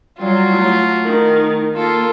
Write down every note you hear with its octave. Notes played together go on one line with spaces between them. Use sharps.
F#3 G3 F4 F#4 D5
A3 E4
D#3 A#4
A#3 F4 A4